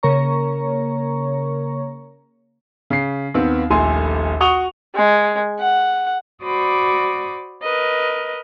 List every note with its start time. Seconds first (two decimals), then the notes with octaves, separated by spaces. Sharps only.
0.03 C#3 A#3 A#4 C#5 A#5 C#6
2.90 C#3 C7
3.34 D#2 B3 C4
3.70 D#1 A#1 A3 A4 G#5 C6
4.40 F#4 F#5 C#6 D#6 F7 G7
4.95 G#3
5.60 F#5
6.43 F#4 C5 D5 B5 D6 D#6
7.62 A#4 B4 D#5